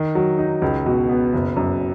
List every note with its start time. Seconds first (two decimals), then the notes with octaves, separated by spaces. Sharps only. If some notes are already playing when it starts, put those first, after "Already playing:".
Already playing: D#3
0.15 F#3
0.38 D#4
0.62 C#2
0.86 B2
1.09 B3
1.33 F#1
1.56 F#2